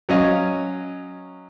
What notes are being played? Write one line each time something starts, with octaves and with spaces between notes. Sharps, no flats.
F#3 C#4 D#5 F5